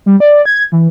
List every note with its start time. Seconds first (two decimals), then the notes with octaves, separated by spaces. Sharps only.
0.06 G3
0.20 D5
0.46 G#6
0.72 E3